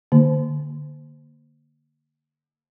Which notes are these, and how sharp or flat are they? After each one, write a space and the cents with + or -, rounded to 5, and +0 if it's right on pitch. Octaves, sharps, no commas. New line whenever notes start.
D3 +10 A#3 +0